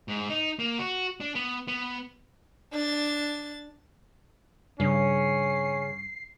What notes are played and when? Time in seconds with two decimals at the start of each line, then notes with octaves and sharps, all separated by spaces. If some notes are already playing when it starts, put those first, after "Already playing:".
0.08 G#2
0.29 D#4
0.59 A#3
0.78 F#4
1.20 D4
1.35 B3
1.68 B3
2.73 D4 A6
4.80 G2 C#3 C#4 C7